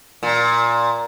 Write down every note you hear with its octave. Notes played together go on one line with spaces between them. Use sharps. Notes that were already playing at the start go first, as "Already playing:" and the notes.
A#2